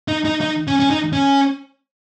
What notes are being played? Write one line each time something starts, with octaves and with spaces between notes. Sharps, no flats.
D#4
D#4
D#4
C#4
C#4
D#4
C#4